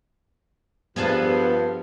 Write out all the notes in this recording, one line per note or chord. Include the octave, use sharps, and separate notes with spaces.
G2 F3 B3 G#4 A4